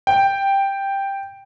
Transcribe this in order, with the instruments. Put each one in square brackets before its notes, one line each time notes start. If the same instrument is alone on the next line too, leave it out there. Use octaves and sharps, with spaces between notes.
[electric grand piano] G5